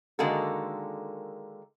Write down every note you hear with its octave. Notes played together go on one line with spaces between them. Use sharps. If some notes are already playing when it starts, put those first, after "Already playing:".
D3 D#3 G#3 A#3 F#4 A4